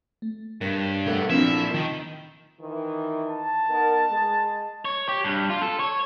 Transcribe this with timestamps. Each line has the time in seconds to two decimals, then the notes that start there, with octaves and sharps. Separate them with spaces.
0.22 A3
0.61 G2 A#4 C#5
1.08 A3 B3 A#4 F#5 F#6
1.30 F3 A#3 C4 D4 E4 E5
1.74 D#3
2.61 D#3 E3
3.27 A5
3.69 B3 D#4 A#4
4.10 G#3
4.85 C#5
5.09 G4
5.24 G2
5.50 F4
5.61 A4
5.79 C#5